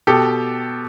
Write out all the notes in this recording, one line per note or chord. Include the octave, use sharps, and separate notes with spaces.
B2 G4 A4